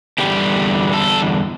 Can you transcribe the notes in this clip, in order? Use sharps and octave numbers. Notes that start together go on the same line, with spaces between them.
E2 D3 G3 G4
A4